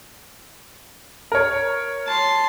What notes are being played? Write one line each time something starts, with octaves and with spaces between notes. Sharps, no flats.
A#4 C#5
A5 C6